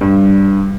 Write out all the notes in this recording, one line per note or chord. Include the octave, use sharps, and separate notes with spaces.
G2